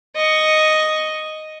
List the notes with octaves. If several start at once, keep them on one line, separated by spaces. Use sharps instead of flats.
D#5 C#6